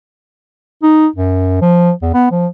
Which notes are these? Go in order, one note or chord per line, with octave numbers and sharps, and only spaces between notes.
D#4
F#2
F3
E2
B3
F3